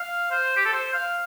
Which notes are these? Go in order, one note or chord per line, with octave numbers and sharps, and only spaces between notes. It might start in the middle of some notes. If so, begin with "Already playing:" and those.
Already playing: F5
C5
G4
A4
C5
F5